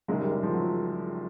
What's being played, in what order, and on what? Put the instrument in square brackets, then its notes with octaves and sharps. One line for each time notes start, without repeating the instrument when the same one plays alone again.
[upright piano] F#1 F#2 D#3 [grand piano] G#3
[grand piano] G3
G3
F3
F#3